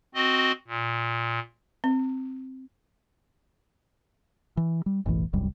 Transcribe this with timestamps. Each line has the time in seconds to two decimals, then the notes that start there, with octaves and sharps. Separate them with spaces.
0.15 C4 F#4 D#5
0.68 A#2
1.84 C4
4.57 E3
4.86 G3
5.06 F#1 B1 A2 E3
5.33 E1 C2 F#2 G3